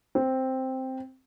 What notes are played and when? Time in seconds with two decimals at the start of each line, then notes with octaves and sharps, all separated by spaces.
0.15 C4